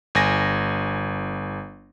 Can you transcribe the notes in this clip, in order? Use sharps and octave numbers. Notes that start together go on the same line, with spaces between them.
G1 G#5 A#6